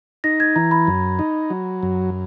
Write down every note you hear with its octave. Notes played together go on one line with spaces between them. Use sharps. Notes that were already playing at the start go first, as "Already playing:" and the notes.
D#4 A#6
G#6
E3 A#5
B5
F#2
D#4
F#3
F#2